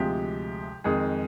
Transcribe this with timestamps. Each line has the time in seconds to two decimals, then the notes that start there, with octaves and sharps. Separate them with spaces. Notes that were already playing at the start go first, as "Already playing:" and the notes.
Already playing: D2 C3 F3 G#3 G4
0.84 F2 D#3 G#3 G#4